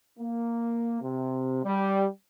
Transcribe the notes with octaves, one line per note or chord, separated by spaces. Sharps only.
A#3
C3
G3